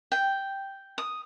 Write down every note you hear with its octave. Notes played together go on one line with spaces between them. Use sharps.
G5
D#6